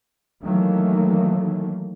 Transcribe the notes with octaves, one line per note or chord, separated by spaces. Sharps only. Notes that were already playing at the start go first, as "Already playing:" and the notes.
D#3 E3 F#3 A3 A#3